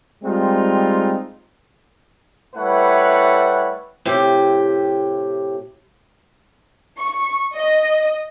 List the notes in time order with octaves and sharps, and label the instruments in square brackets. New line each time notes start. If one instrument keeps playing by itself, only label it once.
[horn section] G3 G#3 C4 D#4 F4
[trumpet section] G3 A3 E4 B4 C#5 F#5
[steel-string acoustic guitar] A2 C3 G4
[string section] C#6
D#5